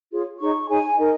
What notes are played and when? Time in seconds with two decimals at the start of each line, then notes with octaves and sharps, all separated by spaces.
0.11 F4 G#4 C#5
0.40 D#4 G#4 C#5 C#6
0.69 D#4 G#4 C#5 G#5
0.98 D#4 A#4 D#5